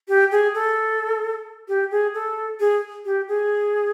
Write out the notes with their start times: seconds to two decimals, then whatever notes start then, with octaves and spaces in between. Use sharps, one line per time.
0.08 G4
0.31 G#4
0.55 A4
1.68 G4
1.91 G#4
2.14 A4
2.60 G#4
3.05 G4
3.28 G#4